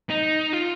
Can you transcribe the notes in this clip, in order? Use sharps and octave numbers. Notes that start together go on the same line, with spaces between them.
D#4
F4